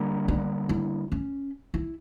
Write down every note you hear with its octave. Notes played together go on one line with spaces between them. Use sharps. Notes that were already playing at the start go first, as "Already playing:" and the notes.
Already playing: D3 G3 A#3
D4
E4
C#4
E4